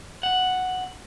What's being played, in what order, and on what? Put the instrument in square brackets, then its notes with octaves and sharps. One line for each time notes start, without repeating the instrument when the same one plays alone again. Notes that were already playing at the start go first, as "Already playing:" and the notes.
[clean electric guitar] F#5